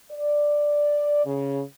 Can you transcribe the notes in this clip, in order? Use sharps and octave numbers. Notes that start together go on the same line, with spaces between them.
D5
C#3